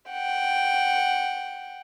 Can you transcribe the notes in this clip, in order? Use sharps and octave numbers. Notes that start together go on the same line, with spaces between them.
F#5 G5